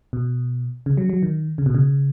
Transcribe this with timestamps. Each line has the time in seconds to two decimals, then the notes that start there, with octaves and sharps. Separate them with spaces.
0.13 B2
0.86 C#3
0.97 F#3
1.10 F#3
1.23 D#3
1.58 C#3
1.66 B2
1.75 C#3